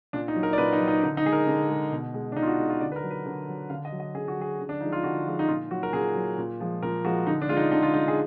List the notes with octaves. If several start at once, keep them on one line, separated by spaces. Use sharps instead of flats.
A#2 D4
D#4
F#3
A#4
D5
A#2 B4
D#4
F#3
D#4
D3 D#4
D#4
G#3 G#4
A#4
D3
G#3
B2
G#3
D4
B2 D#4
F4
F#4
G#3
F4
D3 D5
B4
A#4
F#3
B4
D3
F#3
D3 F5
D#5
F#3
D#5
D3 G#4
F#4
F#3 G#4
D3
D4
F3 G#3 D#4
F4
D3 F#4
F3 G#3
D#4
A#2 F4
F#3 F#4
A#4
A#2 G#4
F#3
A#2
F3 G#3
A#2 A#4
F3 G#3 F#4
D3 D#4
D4
G#3 F4
D#4
D3 D#4
F4
G#3 D#4
G#4